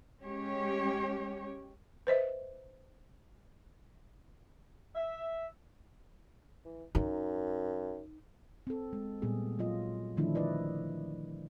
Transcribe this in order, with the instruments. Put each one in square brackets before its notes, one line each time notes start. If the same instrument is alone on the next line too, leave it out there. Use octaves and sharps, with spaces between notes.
[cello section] G#3 C#4 G4 C#5
[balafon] B4 C5 D#5 E5
[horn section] E5
[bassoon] E3
[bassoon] F#2 [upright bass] D#4
[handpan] C4 A4
G#3
A#2 G3 B3 G#4
F#3 F4 D#5
D3 D#3 F3 A3 D4 E4
E4 B4 D5 D#5